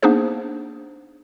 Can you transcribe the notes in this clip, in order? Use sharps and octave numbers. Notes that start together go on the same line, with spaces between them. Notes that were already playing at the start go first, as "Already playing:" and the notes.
A#3 B3 D4 D#4 G#4 C5